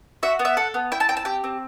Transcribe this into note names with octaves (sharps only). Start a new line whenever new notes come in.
F#4 E5
B3
E5
A4 F#5
B3
E4 G5
A5
C4 G5
A5
G4 G5
C4